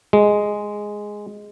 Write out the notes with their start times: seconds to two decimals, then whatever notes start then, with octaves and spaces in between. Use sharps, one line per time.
0.13 G#3